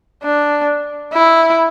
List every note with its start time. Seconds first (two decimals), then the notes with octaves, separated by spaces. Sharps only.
0.23 D4
1.13 E4